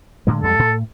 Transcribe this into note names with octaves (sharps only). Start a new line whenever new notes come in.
A2 D3 G#3
F2 G3 G#3 A4
A2